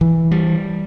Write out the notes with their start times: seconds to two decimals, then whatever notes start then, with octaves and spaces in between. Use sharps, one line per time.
0.01 E3
0.31 G3